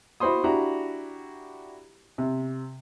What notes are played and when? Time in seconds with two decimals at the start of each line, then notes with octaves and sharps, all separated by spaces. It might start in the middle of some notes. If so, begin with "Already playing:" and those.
0.20 E4 F#4 C5 B5 C6 D#6
0.44 D4 E4 F#4 G4 A#5
2.18 C3